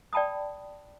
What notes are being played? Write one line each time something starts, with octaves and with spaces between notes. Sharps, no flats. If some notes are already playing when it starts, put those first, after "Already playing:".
D5 G5 A5 B5 D#6